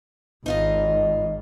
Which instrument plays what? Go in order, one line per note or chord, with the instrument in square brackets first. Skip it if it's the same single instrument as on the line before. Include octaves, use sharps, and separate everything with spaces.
[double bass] G#1 [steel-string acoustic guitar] D#4 F4 D#5